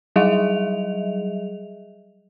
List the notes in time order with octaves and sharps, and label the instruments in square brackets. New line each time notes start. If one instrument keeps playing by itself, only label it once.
[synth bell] F#3 G3 G#4 D#5 E5 F7